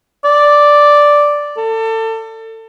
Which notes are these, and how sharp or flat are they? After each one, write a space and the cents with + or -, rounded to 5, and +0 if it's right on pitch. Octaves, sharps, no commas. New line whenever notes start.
D5 +0
A4 +30